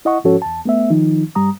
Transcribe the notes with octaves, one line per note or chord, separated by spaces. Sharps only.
E4 D#5 F#5 C#6
G#2 F3 C#4 F#4 A4 C#5
E2 A5
A3 B3 E5
D#3 F3 D#4
G2 G3 A#5 D#6